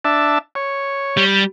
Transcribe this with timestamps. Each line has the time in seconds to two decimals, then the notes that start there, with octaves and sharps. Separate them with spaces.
0.05 D4 E5 A5
0.55 C#5
1.17 G3